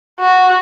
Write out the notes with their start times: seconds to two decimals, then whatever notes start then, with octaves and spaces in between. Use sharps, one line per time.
0.20 F#4